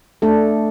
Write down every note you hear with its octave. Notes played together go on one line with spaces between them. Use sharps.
A3 D4 A4